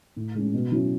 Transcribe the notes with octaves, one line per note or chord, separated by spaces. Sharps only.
A2
G#3 C#4
B2
F#3 C#4 E4